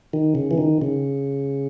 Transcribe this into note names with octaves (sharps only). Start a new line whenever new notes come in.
D#3
C#3
E3
D#3
C#3